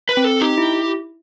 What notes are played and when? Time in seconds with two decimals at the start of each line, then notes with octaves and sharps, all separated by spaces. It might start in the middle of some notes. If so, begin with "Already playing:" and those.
0.09 B4
0.17 C4
0.24 A4
0.41 D#4 G4
0.58 E4